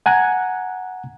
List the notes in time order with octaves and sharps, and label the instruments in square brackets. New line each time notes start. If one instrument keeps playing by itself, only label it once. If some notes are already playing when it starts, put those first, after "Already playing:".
[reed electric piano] F#5 G#5 A#5 F#6 G#6